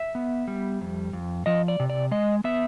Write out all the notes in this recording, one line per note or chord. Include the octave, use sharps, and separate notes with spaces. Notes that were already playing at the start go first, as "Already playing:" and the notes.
Already playing: E5
B3
G3
F2
F2
F3 D#5
D5
C3
D5
G#3 D#5
B3 E5